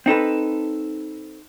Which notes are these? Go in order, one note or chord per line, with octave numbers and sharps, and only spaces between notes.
C4 D#4 A4 B4